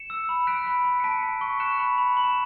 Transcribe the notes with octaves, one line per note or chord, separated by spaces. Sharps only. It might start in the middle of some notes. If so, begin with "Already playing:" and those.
Already playing: C#7 E7
E6
B5
F#6 B6 D7
B5
B5
C#7
A5 B6 D7
A5
C#6
F#6 C#7 E7
B5
B5
B5 F#7
E7